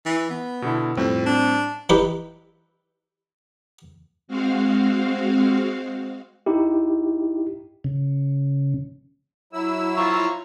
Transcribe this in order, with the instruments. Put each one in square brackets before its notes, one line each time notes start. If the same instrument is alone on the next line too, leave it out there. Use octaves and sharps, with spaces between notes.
[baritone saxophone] E3
B3
[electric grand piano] B2 D3 E4
[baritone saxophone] F2 [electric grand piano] A2 G3 C4
[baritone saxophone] D4
[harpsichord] E3 D#4 E4 G4 B4
[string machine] G#3 C4 F#4 F5
[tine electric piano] D#4 E4 G4
[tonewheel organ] C#3
[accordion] F#3 E4 E6
[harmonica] F4 A#5 C#6